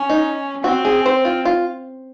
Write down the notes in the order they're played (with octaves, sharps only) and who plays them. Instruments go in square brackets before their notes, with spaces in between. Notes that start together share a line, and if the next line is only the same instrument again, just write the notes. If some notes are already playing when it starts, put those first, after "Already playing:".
Already playing: [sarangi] C#4
[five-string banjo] D#4
[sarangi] C4 [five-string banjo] F#4
[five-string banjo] G#4
C5
F4
F4